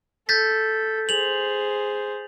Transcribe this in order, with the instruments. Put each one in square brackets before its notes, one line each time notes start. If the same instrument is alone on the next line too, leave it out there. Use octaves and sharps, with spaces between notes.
[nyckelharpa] A4 [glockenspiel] G6 A6 B6
[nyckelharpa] G#4 C5 [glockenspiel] F7 F#7